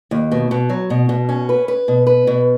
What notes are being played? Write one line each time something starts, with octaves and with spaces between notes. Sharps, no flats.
D#2
B2
B2
F#3
B2
B2
C#4
B4
B4
B2
B4
B2